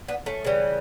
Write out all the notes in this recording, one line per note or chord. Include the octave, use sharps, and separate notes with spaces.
B3 D4
A3 C#4
C#3 E3 G3